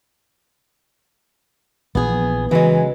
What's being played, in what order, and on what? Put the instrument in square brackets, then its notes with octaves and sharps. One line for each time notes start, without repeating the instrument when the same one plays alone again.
[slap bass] A#1 E3 F3 [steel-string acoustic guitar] B3 G#4
[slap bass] C#3 [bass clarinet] E3 [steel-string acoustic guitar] F#3 G#3